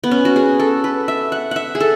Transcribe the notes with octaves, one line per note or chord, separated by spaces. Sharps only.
B3
C#4
F#4
G#4
A4
B4
E5
F#5
E5 F#5
G#4
A4